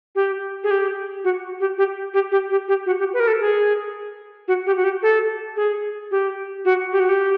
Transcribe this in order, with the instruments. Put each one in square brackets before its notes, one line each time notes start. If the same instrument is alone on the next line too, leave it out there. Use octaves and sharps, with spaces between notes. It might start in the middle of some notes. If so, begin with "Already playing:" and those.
[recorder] G4
G#4
G4
F#4
G4
G4
G4
G4
G4
G4
F#4
G4
B4
A#4
A4
G#4
F#4
G4
F#4
G4
A4
G#4
G4
F#4
G4
F#4
G4